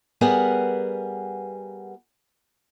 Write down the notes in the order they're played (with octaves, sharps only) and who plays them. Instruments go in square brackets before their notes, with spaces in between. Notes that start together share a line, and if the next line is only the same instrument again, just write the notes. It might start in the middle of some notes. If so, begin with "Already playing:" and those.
[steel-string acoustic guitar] G3 B3 G#4 A#4 F#5